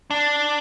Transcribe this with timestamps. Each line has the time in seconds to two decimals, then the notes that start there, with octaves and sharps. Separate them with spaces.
0.11 D4